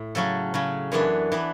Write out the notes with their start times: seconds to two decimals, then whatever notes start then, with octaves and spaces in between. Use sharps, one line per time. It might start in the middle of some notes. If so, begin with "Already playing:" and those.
Already playing: A2
0.15 C#3 F#3 C#4 A4
0.54 C#3 F#3 C#4
0.92 F#2 E3 B3 D4 C#5
1.32 E3 B3 D4